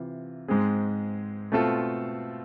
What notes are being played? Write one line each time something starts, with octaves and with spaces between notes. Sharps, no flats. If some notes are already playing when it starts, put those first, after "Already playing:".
Already playing: C3 E3 F4
G#2 G#3 C4 G#4
B2 A3 C4 F4 A4